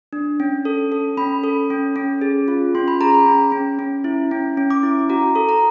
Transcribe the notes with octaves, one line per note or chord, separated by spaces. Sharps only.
D4
C#4
A4
A4
C#4 B5
A4
C#4
C#4
G#4
F4
C#4 C6
B5
G#4 A#5
B5
C#4
C#4
C#4
E4
C#4
C#4
D6
E4
F#4 A#5
A4
A#5